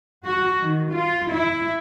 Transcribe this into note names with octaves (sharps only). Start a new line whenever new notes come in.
F#4
D#3
F4
E4